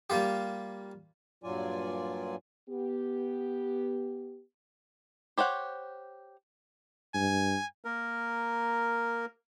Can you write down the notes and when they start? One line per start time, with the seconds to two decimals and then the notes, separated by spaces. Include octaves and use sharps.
0.10 G3 A#3 F4 G4
1.44 G2 A#2 F#3 F4 D5 G#5
2.68 B3 G4
5.38 G4 C5 C#5 F#5
7.14 G2 G#5
7.84 A#3 A#4